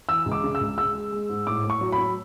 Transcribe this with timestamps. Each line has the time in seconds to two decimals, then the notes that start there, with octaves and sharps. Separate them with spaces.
0.09 E3 E6
0.26 C#2
0.32 D6
0.43 C#3
0.55 E6
0.60 C#2
0.77 G#3 E6
0.95 G#3
1.12 G#3
1.29 G#2
1.47 A2 D6
1.64 A2
1.70 C#6
1.81 F#3
1.92 B5
1.98 F#3